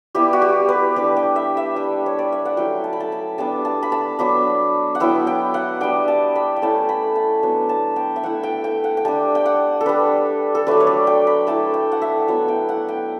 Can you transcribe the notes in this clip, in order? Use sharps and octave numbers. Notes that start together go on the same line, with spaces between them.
G3 B3 E4 G4
F#4
G4
B4
G3 D4 B4
G5
E5
E5
G3 D4
C#5
D5
E5
F#5
F#3 A3 C#4 E4 G5
A5
B5
A5
B5
G3 B3 D4 A5
A5
B5
A5
F#3 B3 D4 B5
F#5
F#3 B3 E4 G5
G5
F#5
G3 D4 G5
A5
B5
G5
A3 C#4 E4 A5
B5
A5
F#3 B3 D4
A5
G5
E5
A3 E4 F#5
G5
G5
F#5
G5
G3 D4 A5
G5
F#5
A4
G3 D4 B4
A4
F#3 A3 D4 B4
C#5
D5
G5
B5
A3 E4 A5
G5
F#5
E5
F#3 B3 E4 F#5
G5
F#5
G5